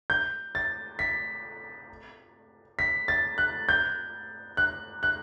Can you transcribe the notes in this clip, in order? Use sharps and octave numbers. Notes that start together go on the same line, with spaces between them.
G6
A6
B6
B6
A6
F#6
G6
F#6
F#6